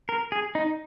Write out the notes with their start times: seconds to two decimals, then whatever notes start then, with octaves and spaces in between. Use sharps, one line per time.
0.09 A#4
0.32 G#4
0.55 D#4